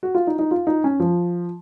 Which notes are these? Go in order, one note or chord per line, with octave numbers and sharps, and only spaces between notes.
F#4
F4
D#4
D#4
F4
D#4
C#4
F3